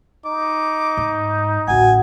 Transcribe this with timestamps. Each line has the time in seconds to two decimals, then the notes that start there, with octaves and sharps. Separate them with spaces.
0.25 D#4 D6
0.97 G#2
1.68 A1 D2 F#4 F#5 G#5